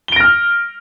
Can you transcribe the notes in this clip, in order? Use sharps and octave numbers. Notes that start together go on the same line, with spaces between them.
F6 A#6 D7 G7